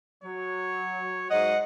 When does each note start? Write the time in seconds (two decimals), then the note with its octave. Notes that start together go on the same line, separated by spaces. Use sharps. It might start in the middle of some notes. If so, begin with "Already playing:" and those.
0.24 F#3 C#5
1.30 G#2 F#3 D#5 F#5